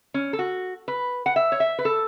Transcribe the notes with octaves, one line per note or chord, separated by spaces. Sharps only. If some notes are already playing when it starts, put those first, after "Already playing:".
C#4
A4
F#4
B4
F#5
E5
C#5
E5
B4
A4